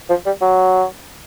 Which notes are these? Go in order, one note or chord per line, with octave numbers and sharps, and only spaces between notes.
F3
G3
F#3